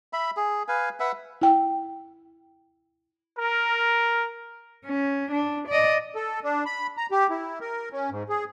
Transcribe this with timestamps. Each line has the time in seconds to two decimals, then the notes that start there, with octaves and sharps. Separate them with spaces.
0.13 E5 B5
0.37 G#4
0.68 B4 F5 G#5
1.00 B4 E5 F#5
1.42 E4 G5
3.37 A#4
4.86 C#4
5.31 D4
5.68 D5 D#5
6.15 A4
6.44 D4
6.66 B5
6.97 A#5
7.11 G4
7.30 E4
7.61 A#4
7.92 C#4
8.11 G#2
8.29 G#4